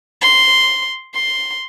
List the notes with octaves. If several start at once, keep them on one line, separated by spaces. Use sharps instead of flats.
C6
C6